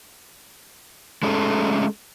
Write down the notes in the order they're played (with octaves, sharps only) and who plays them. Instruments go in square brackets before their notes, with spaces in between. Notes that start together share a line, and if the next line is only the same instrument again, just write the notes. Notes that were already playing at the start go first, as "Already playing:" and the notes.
[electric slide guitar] G#3 A3 C#4 A4